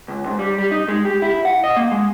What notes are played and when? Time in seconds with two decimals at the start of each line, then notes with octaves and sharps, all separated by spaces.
0.08 C#2
0.26 G#2
0.39 G3
0.58 G3
0.71 D#4
0.88 G#3
1.05 G4
1.22 E4
1.45 F#5
1.64 D#5
1.76 A#3
1.92 G#3